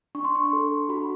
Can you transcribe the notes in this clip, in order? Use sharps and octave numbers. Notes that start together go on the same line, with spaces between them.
D4 C#6
C6
C#6
A4
F#4 B5